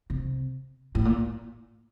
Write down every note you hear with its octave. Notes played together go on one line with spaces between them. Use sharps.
C3
A2
A#2